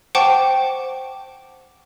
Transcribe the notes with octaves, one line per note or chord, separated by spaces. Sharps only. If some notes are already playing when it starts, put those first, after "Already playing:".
C5 F#5 G5 A5 C#6 D6